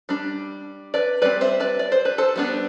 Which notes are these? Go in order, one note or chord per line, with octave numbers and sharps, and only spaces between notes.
G3 D4
B4 D5
G3 C4 B4 D5
C5 E5
B4 D5
D5
C5
B4
A4 C5
G3 B3 D4